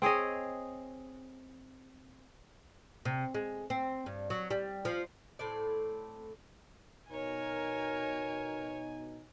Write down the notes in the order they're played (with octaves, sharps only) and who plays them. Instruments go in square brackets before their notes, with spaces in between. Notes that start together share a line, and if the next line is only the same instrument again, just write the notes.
[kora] C4 G#4 C#5 D#5
[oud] C3
G#3
C4
G2
F#3
G3
F3
[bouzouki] A2 C4 D5
[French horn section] B2 D#4 [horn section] A#4 [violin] C#5 [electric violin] G#5